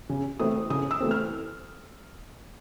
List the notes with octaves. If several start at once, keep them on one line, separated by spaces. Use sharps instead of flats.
C#3
E3 A3 C4 D#6
C#3 D#6
E6
E3 A3 C4
F6